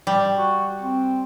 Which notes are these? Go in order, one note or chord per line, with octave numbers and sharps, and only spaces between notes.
G3
F#4
C4